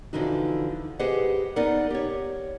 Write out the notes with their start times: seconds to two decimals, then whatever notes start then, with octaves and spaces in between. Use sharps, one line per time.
0.13 D3 E3 F3 D#4 F#4
0.99 G4 G#4 B4 C5 D#5 F#5
1.56 B3 D#4 A#4 D5 F#5
1.90 G4 C#5